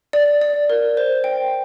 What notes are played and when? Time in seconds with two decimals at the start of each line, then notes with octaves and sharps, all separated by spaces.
0.13 D5
0.41 D5
0.70 A#4
0.97 C5
1.24 G5